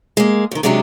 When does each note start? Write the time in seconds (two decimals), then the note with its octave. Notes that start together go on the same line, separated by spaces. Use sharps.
0.17 G#3 A#3
0.51 F2 D#3
0.63 C3 F#3 G#3 D4 F#4 G4